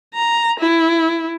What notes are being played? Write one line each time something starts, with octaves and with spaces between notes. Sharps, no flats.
A#5
E4